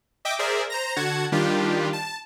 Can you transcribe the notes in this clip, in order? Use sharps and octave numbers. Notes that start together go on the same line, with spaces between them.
D#5 E5 G5 D6
G#4 A#4 C5 D5 E5
C5 A#5 A#6
D3 F#4 F#5 A5 G#6
D#3 G3 D4 F4 G4
A5